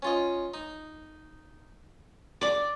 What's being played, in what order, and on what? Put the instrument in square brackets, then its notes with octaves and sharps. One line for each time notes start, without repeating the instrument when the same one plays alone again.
[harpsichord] C#4 F4 D#5
D#4
[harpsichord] D4 [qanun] D5 D6